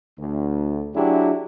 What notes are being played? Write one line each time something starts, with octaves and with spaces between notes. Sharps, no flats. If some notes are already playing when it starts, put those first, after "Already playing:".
D2
F#3 D4 E4 G4 G#4